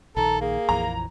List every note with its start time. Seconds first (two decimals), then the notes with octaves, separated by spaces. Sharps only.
0.17 A#1 D#3 A4 A#5
0.41 A#3 G#4
0.69 A#1 F2 E3 A#5